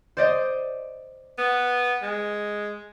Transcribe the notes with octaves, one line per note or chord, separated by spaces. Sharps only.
C5 D5 D#5
B3
G#3